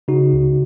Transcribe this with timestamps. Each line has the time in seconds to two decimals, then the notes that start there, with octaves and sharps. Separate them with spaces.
0.08 C#3 D#4 F#4
0.33 C#2